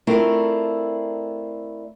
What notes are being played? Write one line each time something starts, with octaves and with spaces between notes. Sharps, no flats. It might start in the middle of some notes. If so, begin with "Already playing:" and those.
A3 C4 D4 E4 F4 A#4